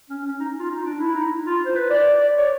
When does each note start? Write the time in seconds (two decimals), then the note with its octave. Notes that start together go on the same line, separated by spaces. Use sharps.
0.10 C#4
0.24 C#4
0.40 D#4
0.59 F4
0.70 D#4
0.86 D4
1.00 E4
1.15 D#4
1.30 E4
1.46 F4
1.66 C5
1.76 B4
1.90 D5
2.21 D5
2.37 C#5